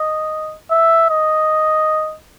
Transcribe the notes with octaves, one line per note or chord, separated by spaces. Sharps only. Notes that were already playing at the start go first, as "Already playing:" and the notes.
Already playing: D#5
E5
D#5